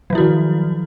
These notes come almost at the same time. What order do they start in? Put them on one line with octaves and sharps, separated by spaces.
F#3 F3 E4 F#4 D#3